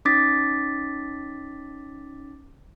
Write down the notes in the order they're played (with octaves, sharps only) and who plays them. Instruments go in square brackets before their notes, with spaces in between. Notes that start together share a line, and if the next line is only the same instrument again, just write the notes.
[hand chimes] C#4 D#4 D6 A6 B6